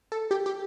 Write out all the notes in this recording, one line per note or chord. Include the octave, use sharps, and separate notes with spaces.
A4
G4
G4